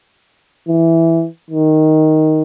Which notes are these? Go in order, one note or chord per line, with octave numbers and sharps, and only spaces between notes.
E3
D#3